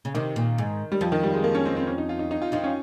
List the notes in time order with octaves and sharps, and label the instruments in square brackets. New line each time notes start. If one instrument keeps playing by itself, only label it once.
[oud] C#3
[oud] C3 [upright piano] D#3
[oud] A#2
G#2
[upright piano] G3
[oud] F2 [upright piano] F3
[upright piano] D#3
G3
G#3
A#3
C#4
C4
C4
C#4
D#4
F4
D#4
D#4
F4
[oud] F2 F3 [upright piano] D#4
[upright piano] C#4